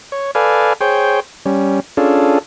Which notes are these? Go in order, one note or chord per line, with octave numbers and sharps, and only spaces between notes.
C#5
A4 B4 D5 F5 G#5
G#4 C5 C#5 G5
G3 C#4
C#4 D4 F4 G#4 A4